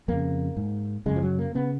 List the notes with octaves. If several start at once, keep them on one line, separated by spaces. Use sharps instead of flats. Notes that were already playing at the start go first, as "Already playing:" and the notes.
F2 C#3 A#3
G#2
F#2 C#3 G#3
F3
F#3
A#3
C#3 B3